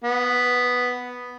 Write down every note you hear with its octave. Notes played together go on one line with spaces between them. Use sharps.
B3